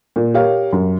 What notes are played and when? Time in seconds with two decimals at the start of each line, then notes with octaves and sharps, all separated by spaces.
0.16 A#2
0.34 G4 A#4 C#5 F5
0.73 F#2